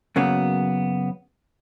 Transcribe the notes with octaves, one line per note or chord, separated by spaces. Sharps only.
F#2 C#3 F#3 A#3 B3